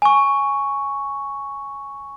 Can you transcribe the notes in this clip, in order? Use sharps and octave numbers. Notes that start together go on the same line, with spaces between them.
G#5 C#6